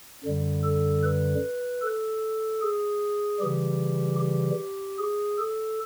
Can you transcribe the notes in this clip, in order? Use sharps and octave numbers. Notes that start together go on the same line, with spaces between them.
F#2 D3 G3
A4
B4
A4
G#4
C#3 E3 G3 G4
G4
G#4
A4